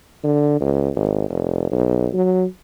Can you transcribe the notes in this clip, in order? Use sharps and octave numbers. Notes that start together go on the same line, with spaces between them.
D3
C#2
G#1
F1
B1
F#3